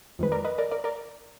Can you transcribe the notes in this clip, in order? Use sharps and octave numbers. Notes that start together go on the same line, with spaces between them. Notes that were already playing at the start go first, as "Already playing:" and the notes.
F2 D#3 G#3 B4
A#4 D5
B4 D#5
A#4 D5
A#4 D5
A#4 D5